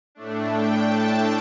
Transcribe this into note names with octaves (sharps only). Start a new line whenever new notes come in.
A2 A3 D4
G5
A5